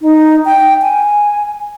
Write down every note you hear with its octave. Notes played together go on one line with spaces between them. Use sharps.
D#4
G5
G#5